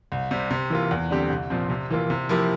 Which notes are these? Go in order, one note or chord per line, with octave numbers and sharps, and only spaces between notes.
C2
C3 G3
C3
E3 A#3 F4
E2
D3 G3 C4 G4
C2
A#2 F3 C4
C3
E3 A#3 F4
C3
F3 A#3 E4 G4